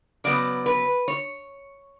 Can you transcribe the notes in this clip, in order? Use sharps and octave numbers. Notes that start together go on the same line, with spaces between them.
C#3 F#3 B3 D5
B4
C#5